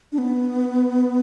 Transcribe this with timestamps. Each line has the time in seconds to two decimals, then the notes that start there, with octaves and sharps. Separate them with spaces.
0.12 D4
0.18 B3